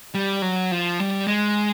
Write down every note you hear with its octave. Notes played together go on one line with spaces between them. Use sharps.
G3
F#3
F3
G3
G#3